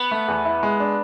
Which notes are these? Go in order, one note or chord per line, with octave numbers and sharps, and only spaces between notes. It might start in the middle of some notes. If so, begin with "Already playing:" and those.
Already playing: B3
A3
E2
E4
G#3
D4